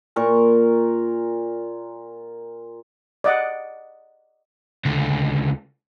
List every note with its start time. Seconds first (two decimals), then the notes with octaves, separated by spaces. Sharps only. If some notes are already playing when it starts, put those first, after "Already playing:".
0.16 A#2 A#4 C#6
3.24 D5 D#5 F#5
4.85 C#2 D3